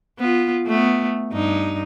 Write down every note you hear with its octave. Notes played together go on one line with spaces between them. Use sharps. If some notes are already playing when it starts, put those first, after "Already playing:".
B3 F4
A3 B3
G2 D#4